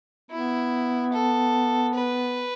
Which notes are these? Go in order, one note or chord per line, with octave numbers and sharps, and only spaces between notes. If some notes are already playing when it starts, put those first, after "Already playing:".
B3 E4
A4
B4